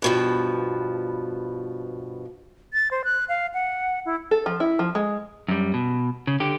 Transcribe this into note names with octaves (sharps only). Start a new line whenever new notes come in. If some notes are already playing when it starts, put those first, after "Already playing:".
G2 B2 F3
A6
C5
F#6
F5
F#5
E4
A4
F3
E4
F3
G#3
F#2 G3
B2
C#3
D3 G4